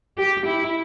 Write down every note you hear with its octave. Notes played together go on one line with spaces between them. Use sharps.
G4
E4